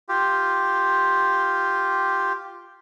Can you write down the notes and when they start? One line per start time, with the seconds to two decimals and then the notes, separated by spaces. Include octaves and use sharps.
0.09 F4 G4